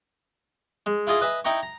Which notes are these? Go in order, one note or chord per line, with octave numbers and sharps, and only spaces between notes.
G#3
E4 F4 G#4 D#5
B4 D#5 E5 G#5 B5
D#4 E4 G5 A#5 C#6
A#5